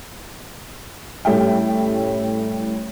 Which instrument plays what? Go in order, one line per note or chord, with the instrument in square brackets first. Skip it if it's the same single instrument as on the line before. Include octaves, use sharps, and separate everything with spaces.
[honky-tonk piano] A2 G3 A3 C#4 E5 G5